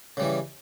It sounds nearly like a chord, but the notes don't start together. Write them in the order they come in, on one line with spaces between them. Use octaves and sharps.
C#3 G3 E3